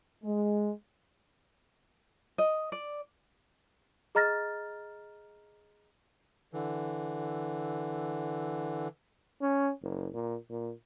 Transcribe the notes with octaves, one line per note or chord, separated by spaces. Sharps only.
G#3
D#5
D5
G#4 D#5 A#5 F6 A6 A#6
D3 E3
C#4
F#1
A#2
A#2